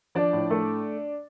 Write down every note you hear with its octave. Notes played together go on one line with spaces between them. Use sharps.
F3 D4 D5
A2
A3